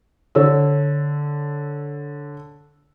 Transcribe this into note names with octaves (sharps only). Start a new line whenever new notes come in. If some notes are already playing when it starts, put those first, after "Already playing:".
D3 C#5 E6